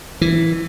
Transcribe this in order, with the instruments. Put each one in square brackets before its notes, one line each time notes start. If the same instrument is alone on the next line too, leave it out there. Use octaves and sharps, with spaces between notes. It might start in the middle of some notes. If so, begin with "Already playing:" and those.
[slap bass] E3